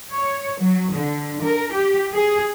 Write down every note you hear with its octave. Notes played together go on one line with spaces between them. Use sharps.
C#5
F#3
D3
A#4
G4
G#4